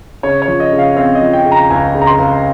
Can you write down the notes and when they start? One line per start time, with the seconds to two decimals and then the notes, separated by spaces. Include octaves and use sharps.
0.23 C#3 C#5
0.42 C#5
0.48 F3
0.60 D#5
0.72 C#3
0.79 F5
0.96 C4 F5
1.15 D#5
1.21 F3
1.33 G5
1.45 C#3
1.51 A#5
1.70 C#2 G#5
1.94 C#3
2.01 A#5
2.07 C6
2.19 C#2